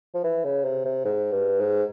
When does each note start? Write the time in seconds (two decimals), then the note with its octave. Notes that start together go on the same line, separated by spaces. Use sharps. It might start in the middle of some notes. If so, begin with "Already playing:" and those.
0.14 F3
0.24 E3
0.44 C#3
0.64 C3
0.85 C3
1.04 G#2
1.32 G2
1.59 G#2